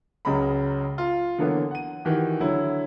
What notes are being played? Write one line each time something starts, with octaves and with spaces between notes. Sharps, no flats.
C#2 C#3 F#3 G#4 A#5 B5
F4
D3 E3 F#3 A#3 B3
F#5 D#7
D#3 E3 F#4 G4
D3 F#3 E4